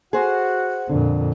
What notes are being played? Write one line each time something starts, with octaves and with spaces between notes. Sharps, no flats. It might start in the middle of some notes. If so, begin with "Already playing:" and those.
F#4 G#4 C5 F#5
F2 A#2 D3